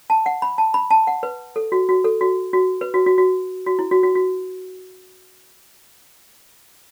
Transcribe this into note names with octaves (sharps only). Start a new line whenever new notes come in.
A5
F#5
B5
A5
B5
A5
F#5
B4
A4
F#4
F#4
A4
F#4
F#4
B4
F#4
F#4
F#4
F#4
E4
F#4
F#4
F#4